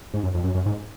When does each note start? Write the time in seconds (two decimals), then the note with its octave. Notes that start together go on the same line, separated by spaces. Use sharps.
0.14 G#2
0.23 F#2
0.34 F2
0.44 F#2
0.55 F#2
0.66 G#2